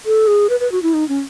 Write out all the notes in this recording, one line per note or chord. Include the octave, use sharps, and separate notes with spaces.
A4
G#4
B4
B4
F#4
E4
D#4
C#4